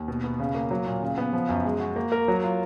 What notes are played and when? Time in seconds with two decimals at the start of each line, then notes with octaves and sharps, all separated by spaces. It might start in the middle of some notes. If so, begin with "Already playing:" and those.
Already playing: D#2
0.08 B2
0.24 B3
0.40 C#3
0.55 A#3
0.71 F#3
0.86 A#2
1.02 C#3
1.18 B3
1.33 F3
1.49 F#2
1.65 G#3
1.80 F#4
1.96 A#3
2.12 A#4
2.28 F#3
2.43 F4